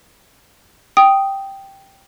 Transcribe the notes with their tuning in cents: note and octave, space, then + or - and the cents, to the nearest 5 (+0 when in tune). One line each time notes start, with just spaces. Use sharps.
G5 +0 D#6 +0